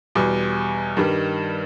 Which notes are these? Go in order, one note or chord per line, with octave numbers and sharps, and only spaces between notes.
E2 B2 G3
G2 D#3 G3